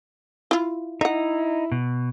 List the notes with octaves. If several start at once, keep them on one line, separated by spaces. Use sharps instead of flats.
E4 F4
D#4 E4 E5 F#5
B2